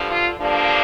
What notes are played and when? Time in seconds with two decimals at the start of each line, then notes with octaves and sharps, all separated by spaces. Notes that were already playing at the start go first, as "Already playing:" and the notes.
Already playing: G2 D3 F3
0.11 F4
0.39 G2 D3 F3 A#3 D4